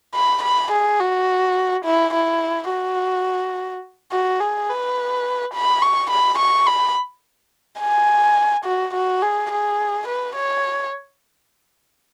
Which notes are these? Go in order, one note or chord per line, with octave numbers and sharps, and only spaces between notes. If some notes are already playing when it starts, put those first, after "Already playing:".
B5
B5
G#4
F#4
E4
E4
F#4
F#4
G#4
B4
B5
C#6
B5
C#6
B5
G#5
F#4
F#4
G#4
G#4
B4
C#5